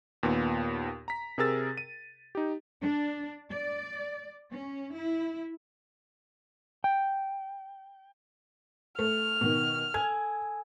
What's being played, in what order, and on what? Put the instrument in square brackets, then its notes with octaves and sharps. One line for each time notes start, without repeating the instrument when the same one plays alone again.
[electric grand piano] D#2 A#2 B3
A#5 B6
C3 G#4 A#4 E6 A6
D#7
D#4 G4
[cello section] D4
D5
C#4
E4
[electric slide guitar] G5
[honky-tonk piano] A3 [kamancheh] F6
[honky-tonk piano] B2 D#3
[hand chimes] A4 G#5 E6 [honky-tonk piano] G#6